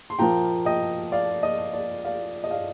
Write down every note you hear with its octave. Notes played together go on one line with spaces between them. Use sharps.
C6
A#2 F3 A#3 G5 A#5
D#5 G5
D5 F5
D#5
D5
D5 F5
D#5
D5 F5